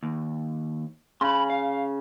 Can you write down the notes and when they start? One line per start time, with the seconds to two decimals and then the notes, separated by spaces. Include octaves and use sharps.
0.03 D#2
1.21 C#3 B5 C6
1.50 F5